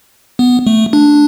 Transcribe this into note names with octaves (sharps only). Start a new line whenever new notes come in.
B3
A3
D4